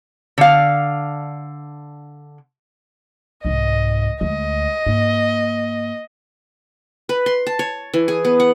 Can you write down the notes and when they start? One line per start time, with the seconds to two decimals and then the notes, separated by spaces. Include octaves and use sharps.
0.38 D3 F5
3.45 C2 G#2 D#5
4.21 D2 G#3 D#5
4.86 G#2 A#3
7.09 B4
7.26 C6
7.47 A5
7.59 C#5
7.94 E3
8.08 G#4
8.25 B3
8.40 F#5